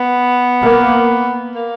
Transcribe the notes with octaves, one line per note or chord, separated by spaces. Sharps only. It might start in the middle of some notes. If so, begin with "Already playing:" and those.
Already playing: B3
A#3
A#3